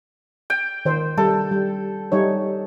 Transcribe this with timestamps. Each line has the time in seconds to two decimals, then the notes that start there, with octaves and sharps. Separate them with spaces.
0.50 G5
0.85 D#3 C5
1.18 G3 A4
1.51 G3
2.12 G3 D#4 C#5